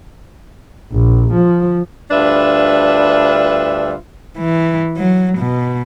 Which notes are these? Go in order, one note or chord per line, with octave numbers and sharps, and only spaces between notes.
A#1
F3
D2 G3 D4 F4 B4 E5
E3
F#3
B2